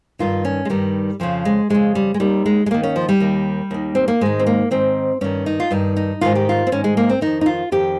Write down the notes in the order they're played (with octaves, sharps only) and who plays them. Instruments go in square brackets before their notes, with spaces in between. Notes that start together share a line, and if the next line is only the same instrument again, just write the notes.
[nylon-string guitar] G2 D#3 F4
C#4
G#3
G2 D#3 G3
F2 C#3 F3
G#3
F2 C#3 G#3
G3
G#3
D#2 D#3 G3
G#3
G#3
D#2 D#3 A#3
C#4
F3
G3
D#2 D#3
D#2 D#3
C4
A#3
G#2 D#3 G#3
C4
A#3
G#2 D#3 C4
G2 D#3 C#4
D#4
F4
G2 D#3 D#4
D#4
G#2 D#3 F4
G4
F4
C4
G#2 D#3 C#4
G#3
A#3
C4
F2 D#3 D#4
D#4
F4
F2 D#3 G4